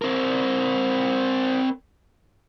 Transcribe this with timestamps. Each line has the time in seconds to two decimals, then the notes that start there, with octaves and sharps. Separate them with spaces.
0.02 C4 A#4